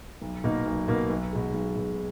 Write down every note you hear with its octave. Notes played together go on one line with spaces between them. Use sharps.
B1
B2 A#3 D#4 A#4
B1
B2 A#3 D#4 A#4
B1
B2 G#3
B1
B2 G#3